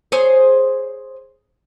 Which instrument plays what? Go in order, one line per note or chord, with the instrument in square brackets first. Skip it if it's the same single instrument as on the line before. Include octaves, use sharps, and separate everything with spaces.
[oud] G#4 C5 C#5